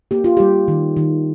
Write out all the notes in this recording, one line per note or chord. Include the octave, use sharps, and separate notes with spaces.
A#3 G4
F4
G3 G4
D#3
D#3